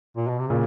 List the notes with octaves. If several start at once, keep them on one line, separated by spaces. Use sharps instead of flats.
A#2
B2
C3
A#2 C#3